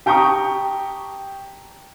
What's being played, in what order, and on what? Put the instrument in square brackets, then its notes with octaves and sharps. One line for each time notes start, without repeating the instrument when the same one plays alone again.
[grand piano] G4 G5 A5 A#5 C#6 D#6